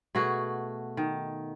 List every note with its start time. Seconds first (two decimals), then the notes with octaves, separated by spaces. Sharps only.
0.15 B2 A3 F#4 G#4
0.97 D#3